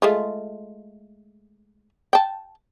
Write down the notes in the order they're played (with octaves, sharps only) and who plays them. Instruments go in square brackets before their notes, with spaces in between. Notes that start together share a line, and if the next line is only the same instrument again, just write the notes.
[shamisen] G#3 A3 F4
G5 A5